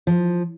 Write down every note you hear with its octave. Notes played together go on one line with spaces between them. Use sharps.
F3